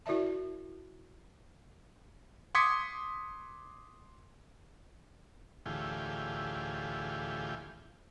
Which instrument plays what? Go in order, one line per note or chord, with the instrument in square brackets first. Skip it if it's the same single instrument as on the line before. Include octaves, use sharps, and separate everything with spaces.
[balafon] E4 F#4 A#4 D5 E5 A5
[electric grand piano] C6 D6 D#6 G#6 B6 C#7
[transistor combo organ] D2 A2 E3 F4 G4 G#4